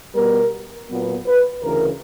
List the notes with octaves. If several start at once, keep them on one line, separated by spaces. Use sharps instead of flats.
B2 G3 B3 A#4
A#2 F#3 B3
B4
D2 C#3 E3 A#4